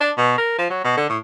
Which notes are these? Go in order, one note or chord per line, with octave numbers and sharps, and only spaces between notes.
D4
B2
A#4
F3
F#3
B2
D3
A2